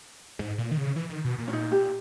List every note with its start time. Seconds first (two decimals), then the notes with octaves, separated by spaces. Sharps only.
0.39 G#2
0.58 A#2
0.71 D#3
0.78 C#3
0.96 E3
1.10 D#3
1.25 B2
1.38 A#2
1.48 C#4
1.53 D#4
1.72 G4